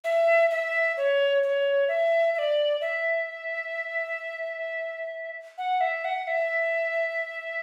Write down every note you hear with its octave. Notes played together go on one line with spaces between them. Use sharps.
E5
E5
C#5
C#5
E5
E5
D5
E5
F#5
E5
F#5
E5